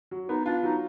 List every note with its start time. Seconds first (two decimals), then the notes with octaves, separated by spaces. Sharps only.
0.11 F#3
0.29 B3 D#4
0.46 D4 F4
0.63 F#3 D#4